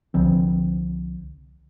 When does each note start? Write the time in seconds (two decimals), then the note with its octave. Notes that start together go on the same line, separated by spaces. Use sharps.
0.14 C2 D3 F3 C4